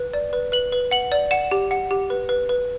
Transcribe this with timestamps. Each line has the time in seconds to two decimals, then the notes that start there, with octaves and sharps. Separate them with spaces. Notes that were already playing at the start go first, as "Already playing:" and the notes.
Already playing: B4
0.14 D5
0.33 B4
0.52 B4 F#7
0.72 B4
0.91 F#5 F#7
1.12 D5
1.31 F#5 E7
1.51 G4
1.71 F#5
1.91 G4
2.10 B4
2.29 B4
2.49 B4